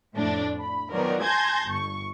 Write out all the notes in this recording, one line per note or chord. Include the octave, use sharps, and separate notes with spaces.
F2 A2 D4
B5
D#3 F3 F#3 B3 A#4 D5
G#5 A5 C6 G6 G#6 A#6
G1 C#6